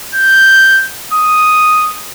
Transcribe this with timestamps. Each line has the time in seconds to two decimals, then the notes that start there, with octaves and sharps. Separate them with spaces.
0.15 G6
1.13 D#6